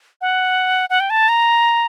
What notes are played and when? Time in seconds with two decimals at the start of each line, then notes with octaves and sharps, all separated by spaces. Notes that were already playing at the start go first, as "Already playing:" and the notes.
0.21 F#5
0.90 F#5
1.00 G5
1.10 A5
1.29 A#5